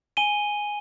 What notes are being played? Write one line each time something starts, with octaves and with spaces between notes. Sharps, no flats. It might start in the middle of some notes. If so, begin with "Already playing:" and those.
G#5 D#7 G7